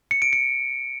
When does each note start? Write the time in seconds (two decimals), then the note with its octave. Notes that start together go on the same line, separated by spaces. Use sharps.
0.11 C#7
0.22 D7
0.33 C#7